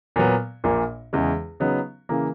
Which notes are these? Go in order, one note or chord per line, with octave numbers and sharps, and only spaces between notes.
A#2 F#3 B3
A#1 A#2 A#3
E2 C#3 G#3
C#3 F#3 B3 D#4
C#3 E3 A#3